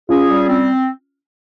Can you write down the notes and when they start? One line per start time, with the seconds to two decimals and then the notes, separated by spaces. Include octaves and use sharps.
0.09 C#4 F4 G#4
0.28 G3
0.47 C4